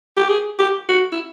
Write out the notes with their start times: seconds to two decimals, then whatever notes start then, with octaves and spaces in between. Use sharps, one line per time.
0.17 G4
0.29 G#4
0.59 G4
0.89 F#4
1.12 E4